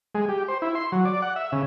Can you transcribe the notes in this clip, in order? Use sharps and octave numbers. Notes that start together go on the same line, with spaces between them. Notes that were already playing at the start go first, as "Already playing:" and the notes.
G#3
G4
C5
E4
C6
F#3
D5
F#5
E5
C#3